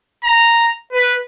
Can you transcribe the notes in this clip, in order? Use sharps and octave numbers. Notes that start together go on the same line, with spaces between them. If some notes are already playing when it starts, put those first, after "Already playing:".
A#5
B4